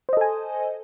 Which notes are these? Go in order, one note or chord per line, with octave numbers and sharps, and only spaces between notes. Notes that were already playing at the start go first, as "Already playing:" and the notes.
A4 C5 D#5 G#5